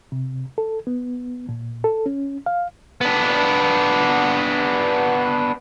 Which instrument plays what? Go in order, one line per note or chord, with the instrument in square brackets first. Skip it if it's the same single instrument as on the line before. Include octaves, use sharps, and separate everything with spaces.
[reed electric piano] C3
A4
B3
A#2
A4
C#4
F5
[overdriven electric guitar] B3 D4